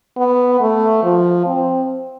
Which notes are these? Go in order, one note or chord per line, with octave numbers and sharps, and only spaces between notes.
B3
A3
F3
C4